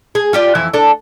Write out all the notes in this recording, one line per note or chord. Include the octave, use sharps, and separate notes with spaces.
G#4
F4 G4 D5
F2 E3 E4
D4 A4